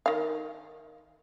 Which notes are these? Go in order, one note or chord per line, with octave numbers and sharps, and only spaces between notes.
D#3 F5